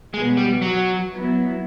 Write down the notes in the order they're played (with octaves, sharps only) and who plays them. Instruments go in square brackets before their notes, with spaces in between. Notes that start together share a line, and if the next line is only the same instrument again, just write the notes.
[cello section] B2 F#3 B3 [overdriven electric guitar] G#3
[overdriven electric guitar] G3
F#3
[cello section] F#3 B3 E4